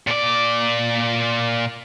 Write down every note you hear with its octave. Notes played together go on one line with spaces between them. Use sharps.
A#2 D5